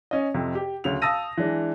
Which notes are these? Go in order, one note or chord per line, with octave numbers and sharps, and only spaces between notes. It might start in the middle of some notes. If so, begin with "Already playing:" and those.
C#4 D#5
F2 C3
G4
D2 C#3 F7
F5 A5 D#6 E6 A#6 D#7
E3 G#3 D4